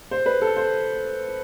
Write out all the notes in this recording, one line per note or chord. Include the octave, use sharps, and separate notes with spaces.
C5
B4
A4
C5